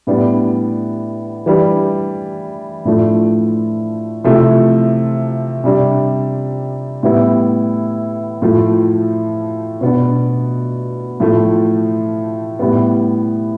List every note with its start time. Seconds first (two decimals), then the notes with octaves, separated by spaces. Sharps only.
0.07 A2 G3 B3 D4
1.46 E3 G3 D4
2.85 A2 F3 A3 D4
4.24 C3 F3 A3 E4
5.64 C3 G3 D4
7.03 A2 G3 B3 E4
8.42 A2 F3 A3
9.81 B2 B3 D4
11.20 A2 F3 A3
12.59 A2 G3 B3